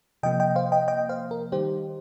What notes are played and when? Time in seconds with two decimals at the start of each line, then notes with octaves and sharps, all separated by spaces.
0.23 C3 F3 A#3 D#5 G5
0.40 D#5 G5
0.55 C5 F5
0.72 D#5 G5
0.88 D#5 G5
1.09 C5 F5
1.31 A#4
1.52 D#3 G3 D#4 G4 C5